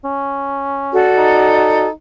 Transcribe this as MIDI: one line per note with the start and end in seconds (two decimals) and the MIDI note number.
0.05 1.07 61
0.92 1.86 66
0.92 1.86 69
0.92 1.86 74
1.18 1.90 63